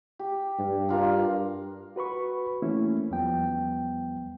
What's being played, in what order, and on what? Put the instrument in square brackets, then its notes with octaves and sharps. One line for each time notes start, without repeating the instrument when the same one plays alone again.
[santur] G4
[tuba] G2
[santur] D4 F4 A#4
[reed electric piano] F#4 B4 B5 C#6
E3 A3 A#3 C4 C#4 E4
E2 F3 G3 B3 G5